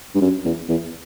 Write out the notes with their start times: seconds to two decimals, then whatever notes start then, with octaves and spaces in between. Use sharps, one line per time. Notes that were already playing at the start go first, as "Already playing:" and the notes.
0.15 G2
0.21 F#2
0.45 E2
0.69 E2